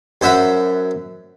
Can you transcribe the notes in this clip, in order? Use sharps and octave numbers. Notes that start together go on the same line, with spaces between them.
F#2 C5 E5 F#5 B5